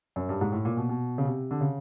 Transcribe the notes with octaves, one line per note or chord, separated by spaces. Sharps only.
F#2
G2
G#2
A2
A#2
B2
B2
C#3
C3
D3
C#3